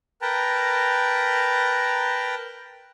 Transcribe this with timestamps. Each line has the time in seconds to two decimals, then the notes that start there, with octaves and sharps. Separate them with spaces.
0.22 A#4 B4 G5 A5 A#5